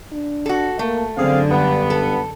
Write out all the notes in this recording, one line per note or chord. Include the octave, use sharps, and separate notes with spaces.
D4
F#4 A4
A3 A#3
F#2 D3 C4 D4 G#4 F5
G2 B3
A4